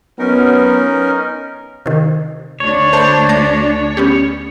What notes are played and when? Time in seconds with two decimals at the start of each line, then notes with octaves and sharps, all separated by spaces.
0.19 F#3 B3 C#4 D#4 A#4
1.86 C3 D#3
2.60 D2 D4 C#5
2.93 A3 C5 A5 B5
3.29 A3 D6 A#6 C7
3.97 B3 C#4 G4